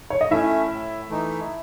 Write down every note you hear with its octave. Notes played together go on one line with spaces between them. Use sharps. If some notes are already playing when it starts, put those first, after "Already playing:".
C#5
D#5
A3 C#4 E4 E5
A2
E3 A3 D#4